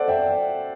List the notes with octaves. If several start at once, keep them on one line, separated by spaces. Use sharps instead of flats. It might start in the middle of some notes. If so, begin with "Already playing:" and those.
Already playing: A4 C5 D5 F#5
E5 G5